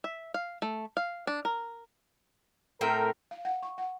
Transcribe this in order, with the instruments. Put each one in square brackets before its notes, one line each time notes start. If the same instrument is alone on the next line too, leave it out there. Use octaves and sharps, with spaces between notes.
[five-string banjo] E5
F5
A3
F5
D4
A#4
[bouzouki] A2 C4 G5 [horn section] A#4
[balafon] F5
F#5
C#6
F#5